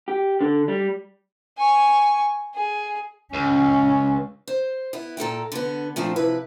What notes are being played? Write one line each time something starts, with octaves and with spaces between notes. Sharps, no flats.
G4
D3
G3
G#5 C#6
G#4
C#2 C#4
C5
B3 E4
A#2 A4 A#4 G5
D3 B3
A#2 F3 A3 C4 D4
C3 F3 E4 B4